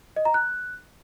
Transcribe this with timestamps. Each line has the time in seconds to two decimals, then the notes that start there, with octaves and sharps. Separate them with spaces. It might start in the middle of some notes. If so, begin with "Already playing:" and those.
0.16 D#5
0.25 A#5
0.34 F#6